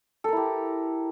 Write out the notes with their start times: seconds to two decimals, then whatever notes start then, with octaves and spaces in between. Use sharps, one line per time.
0.24 A4
0.28 A#4
0.33 E4
0.37 G4